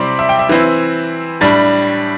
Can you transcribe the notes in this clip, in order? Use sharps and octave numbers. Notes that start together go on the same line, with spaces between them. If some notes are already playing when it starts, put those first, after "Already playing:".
Already playing: C3 G3 C4 E4 C6 D6
E5
G5
E5
E3 C4 E4
A2 G3 D4